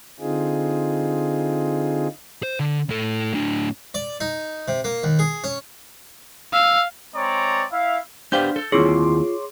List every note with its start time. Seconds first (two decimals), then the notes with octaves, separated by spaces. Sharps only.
0.20 D3 C4 D#4 F4 G#4
2.43 C5
2.60 D3
2.90 A2 A4
3.34 A2 D4
3.94 D5
4.20 D#4
4.68 C3
4.84 A#3
5.03 D#2
5.19 G#4
5.44 C#4
6.53 F5 E6
7.15 G#3 C4 C#5 D5 A#5
7.72 E4 E5 F5
8.32 B3 D4 G4 C5 F5 G5 G6
8.56 A4
8.72 D#2 C4 E4 F4 G#4 C#5 C6 D6